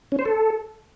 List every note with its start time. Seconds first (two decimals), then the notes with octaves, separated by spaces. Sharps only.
0.12 C#4
0.19 C5
0.25 A4